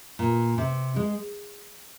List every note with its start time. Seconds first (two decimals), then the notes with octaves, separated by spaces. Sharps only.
0.19 A#2
0.58 C3
0.96 G#3